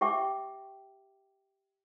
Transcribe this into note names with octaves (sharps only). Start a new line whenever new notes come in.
G4 E5 G5 D6